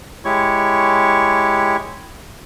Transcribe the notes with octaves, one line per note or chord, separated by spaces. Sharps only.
G#3 E4 G4 C#5 C#6